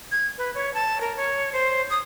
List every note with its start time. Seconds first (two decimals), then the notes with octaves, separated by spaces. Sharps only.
0.12 G#6
0.38 B4
0.55 C#5
0.74 A5
1.01 A#4
1.17 C#5
1.53 C5
1.90 D#6